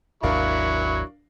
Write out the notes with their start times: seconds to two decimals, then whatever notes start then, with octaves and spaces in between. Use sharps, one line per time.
0.23 G#1 D#2 F#3 D4 E4 A#4 F5 C#6